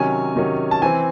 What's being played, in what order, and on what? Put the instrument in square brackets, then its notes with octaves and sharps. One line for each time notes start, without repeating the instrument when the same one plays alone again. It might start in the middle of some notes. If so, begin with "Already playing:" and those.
Already playing: [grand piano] C3 D#3 F#3 C#4 G#5
C3 D#3 F#3 C#4
A5
E3 C4 G#5